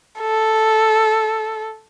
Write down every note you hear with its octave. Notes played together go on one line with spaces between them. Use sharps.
A4